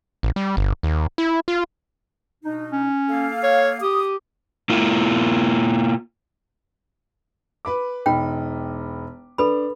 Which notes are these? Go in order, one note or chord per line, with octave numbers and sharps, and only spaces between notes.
A1
G3
G1
D#2
E4
F4
B2 D4 D#4
C#4
A#3 A4 F5
C#5
G4 D#6
A#3 E4 F4
B4 B5 D6
E1 D#4 G5 B5
D4 A4 B4 B5